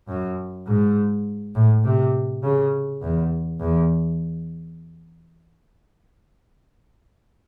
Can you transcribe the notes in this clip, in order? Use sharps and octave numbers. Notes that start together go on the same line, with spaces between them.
F#2
G#2
A2
C3
C#3
E2
E2